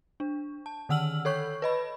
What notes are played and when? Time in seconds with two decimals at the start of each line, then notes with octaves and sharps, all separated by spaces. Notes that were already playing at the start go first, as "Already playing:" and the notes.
0.20 D4
0.66 A5
0.89 D3 D#3 F#5 E6 F6 F#7
1.25 A4 C#5 C#6 G6
1.62 B4 D#5 B5